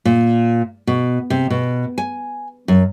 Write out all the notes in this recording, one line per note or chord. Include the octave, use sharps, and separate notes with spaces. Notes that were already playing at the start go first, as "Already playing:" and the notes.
A#2
B2
C3
B2
G#5
F#2